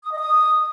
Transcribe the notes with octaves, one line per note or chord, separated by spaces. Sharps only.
D#6
D#5
D#6